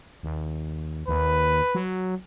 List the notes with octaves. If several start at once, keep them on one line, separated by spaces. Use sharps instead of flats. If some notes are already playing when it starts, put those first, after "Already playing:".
D#2
D#2 B4
F#3